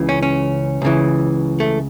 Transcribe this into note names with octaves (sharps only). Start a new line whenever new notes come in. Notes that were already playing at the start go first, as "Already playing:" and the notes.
Already playing: C#2 C#3 E3
C#4
C#4
C#2 C#3 E3
A3